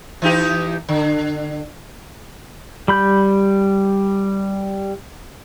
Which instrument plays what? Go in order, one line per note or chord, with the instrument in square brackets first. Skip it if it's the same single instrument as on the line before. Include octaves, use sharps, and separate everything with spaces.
[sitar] E3 D#4 G4
D3
[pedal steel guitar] G3 B5 G6